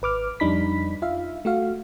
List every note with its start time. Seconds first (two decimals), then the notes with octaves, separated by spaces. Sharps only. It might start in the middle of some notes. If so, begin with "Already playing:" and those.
0.02 G#1 B4 D6 F6
0.40 F2 G3 D4 D#4 B5 B6
1.02 F4 E5 F5
1.45 A3 F#4 F5